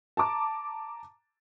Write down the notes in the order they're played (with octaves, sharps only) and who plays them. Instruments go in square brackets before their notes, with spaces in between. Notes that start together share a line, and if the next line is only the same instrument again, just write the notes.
[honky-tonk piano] A5 A#5 D6